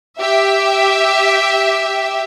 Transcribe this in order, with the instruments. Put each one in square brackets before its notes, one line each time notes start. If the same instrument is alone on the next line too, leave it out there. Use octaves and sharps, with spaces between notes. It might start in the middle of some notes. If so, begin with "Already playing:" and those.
[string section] G4 E5